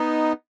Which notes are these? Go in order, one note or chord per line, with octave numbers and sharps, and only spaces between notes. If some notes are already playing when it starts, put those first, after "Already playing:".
Already playing: B3 D#4